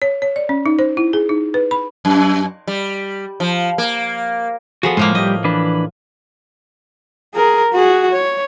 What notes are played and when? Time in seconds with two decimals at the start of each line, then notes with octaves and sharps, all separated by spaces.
0.02 C#5
0.22 C#5
0.36 D5
0.49 C#4
0.66 D#4
0.79 C5
0.97 E4
1.13 G#4
1.29 D#4
1.54 B4
1.71 B5
2.05 F#2
2.67 G3
3.40 F3
3.78 A#3
4.83 F3 B3 F#4 G#4 A4
4.97 A2 F3 G#3 A#3
5.15 G3 G4 D#5
5.44 E3 D4 B4
7.35 G#4 A#4
7.73 F#4 G#4
8.12 C#5